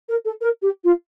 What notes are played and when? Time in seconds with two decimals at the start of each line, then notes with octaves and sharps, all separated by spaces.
0.08 A#4
0.25 A4
0.41 A#4
0.62 G4
0.84 F4